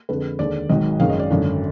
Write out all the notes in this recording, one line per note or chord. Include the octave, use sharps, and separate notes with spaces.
F2 D3 G#3 B4
D#2 D3 G#3 D5
G#1 G#2 D#3 F#3 D#5
G#1 F#2 D#3 G#3 F5
D#5
D5
G#1 F#2 D3